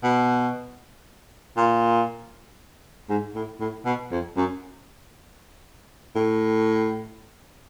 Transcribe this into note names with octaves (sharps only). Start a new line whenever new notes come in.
B2
A#2
G#2
A2
A2
B2
F2
F#2
A2